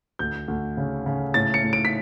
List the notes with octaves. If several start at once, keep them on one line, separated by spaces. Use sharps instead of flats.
D2 G6
D2
C#3
C#3
A2 A6
C#7
A2
D7
B6